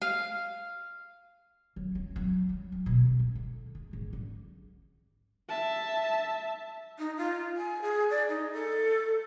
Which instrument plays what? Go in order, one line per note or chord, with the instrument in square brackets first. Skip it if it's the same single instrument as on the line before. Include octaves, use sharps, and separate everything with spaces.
[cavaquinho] F5
[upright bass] F#3
C4
F#3
G3
F2
B2
G#1
F3
D3
G#3
G#1
D3
[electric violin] E5 A5
[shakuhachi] D#4
F4
G#5
G#4
D5
D#4
A4